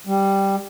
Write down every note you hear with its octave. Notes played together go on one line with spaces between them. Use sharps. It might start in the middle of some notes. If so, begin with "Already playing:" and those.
G3